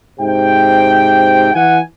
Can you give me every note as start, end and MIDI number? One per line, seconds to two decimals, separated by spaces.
0.20 1.52 44
0.20 1.52 48
0.20 1.52 79
1.54 1.79 52
1.54 1.79 78
1.54 1.79 80